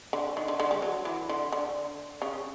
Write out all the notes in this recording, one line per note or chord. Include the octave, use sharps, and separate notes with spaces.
D3
D#3
D3
D3
G#3
F#3
E3
D3
D3
C#3